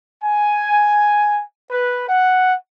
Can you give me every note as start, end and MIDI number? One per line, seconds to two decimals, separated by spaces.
0.24 1.41 80
1.71 2.07 71
2.09 2.55 78